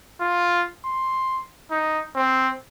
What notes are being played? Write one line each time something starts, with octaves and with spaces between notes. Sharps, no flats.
F4
C6
D#4
C4